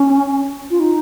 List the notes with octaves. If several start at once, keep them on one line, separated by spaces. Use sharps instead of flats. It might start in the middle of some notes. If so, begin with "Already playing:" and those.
Already playing: C#4
F4
D#4